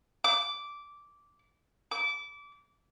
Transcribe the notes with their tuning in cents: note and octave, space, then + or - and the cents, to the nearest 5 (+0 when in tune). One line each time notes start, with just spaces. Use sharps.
D6 -10
D6 -25